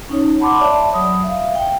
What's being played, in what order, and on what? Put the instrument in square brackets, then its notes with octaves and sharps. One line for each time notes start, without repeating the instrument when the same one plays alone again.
[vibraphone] C#4 D#4 C#5
F#5 A5 B5 C6 D6
C#5 D5 E5 A5 B5
F#3 B5 D#6
E5 F5
G5